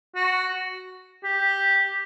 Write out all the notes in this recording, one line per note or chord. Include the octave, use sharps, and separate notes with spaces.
F#4
G4